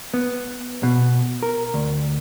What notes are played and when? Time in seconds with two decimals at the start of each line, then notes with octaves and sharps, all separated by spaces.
0.14 B3
0.83 B2
1.43 A#4
1.74 D2